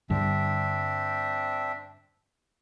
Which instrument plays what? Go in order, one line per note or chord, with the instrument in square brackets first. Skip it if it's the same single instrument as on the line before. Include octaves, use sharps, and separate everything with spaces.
[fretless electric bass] G2 D3 G3 [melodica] C4 D4 E5